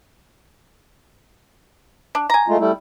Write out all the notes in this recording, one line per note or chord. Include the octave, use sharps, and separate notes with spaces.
D4
G#5 A#5
G#3 A3 F4
G3 A3 E4